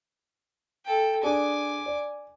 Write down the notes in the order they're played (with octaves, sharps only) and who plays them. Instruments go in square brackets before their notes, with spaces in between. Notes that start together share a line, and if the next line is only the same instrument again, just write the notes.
[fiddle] A4 G5
[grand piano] D4 G#4 [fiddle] G#5 D6
[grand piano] D5